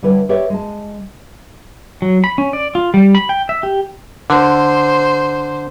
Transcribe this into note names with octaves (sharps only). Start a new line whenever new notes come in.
D3 G3 E4 B4 C#5
G4 B4 C#5 D5 E5
G#3 A5
F#3
B5
C#4
D5
F4
G3
B5
G5
E5
G4
D3 C5